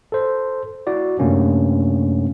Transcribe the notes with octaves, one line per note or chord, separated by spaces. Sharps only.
A4 C5
E4 F#4 D5
F#2 C3 A3 A#3 C#4 D4